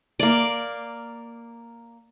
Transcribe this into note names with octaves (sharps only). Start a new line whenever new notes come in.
A#3 D5